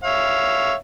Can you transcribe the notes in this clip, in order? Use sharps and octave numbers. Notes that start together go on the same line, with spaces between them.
C#5 E5 F5